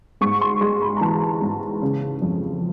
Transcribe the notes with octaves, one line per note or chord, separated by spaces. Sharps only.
G#2 C#6
C6
G#3 C6
B5
A#5
E3 A5
G#2
C#3
F2